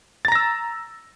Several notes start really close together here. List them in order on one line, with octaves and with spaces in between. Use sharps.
A6 A#5 A#6 E6